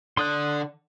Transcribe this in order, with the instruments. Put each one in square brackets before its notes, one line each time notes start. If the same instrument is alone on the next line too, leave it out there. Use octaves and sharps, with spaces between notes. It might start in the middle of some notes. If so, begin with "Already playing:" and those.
[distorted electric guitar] D3 D5 [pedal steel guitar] C6 D#6 F#6